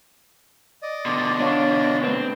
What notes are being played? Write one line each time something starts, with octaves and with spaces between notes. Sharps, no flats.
D5 D#5
B2 D3 C6 D6 A6
D4 C#5 F5 C#6
A3 C4 B4